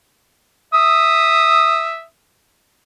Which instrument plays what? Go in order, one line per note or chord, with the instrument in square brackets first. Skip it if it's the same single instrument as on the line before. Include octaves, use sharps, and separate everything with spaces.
[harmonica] E5 D#6